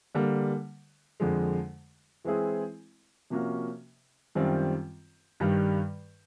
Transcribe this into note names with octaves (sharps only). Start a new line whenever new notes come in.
D3 G3 A#3
F2 D3 F3 G#3
E3 G#3 C4 E4 G#4
C3 F3 A#3 C#4 F#4
F#2 D#3 G3 C4 F4
G2 D#3 G3